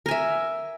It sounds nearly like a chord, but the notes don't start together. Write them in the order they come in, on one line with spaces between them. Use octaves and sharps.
A#4 G#5 E5